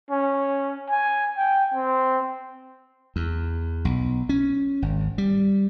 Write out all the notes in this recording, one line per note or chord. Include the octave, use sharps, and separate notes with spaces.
C#4
G#5
G5
C4
E2
B1
C#4
G#1
G3